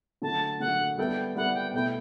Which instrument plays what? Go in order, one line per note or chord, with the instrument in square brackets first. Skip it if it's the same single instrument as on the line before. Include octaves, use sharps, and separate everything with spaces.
[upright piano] D3 F#3 A3 [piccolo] A5
[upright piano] D3 F#3 A3 [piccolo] F#5
[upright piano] G3 B3 E4 A4 [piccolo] G5
[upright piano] G3 B3 E4 A4 [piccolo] F#5
[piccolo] G5
[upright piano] B2 A3 E4 [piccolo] G5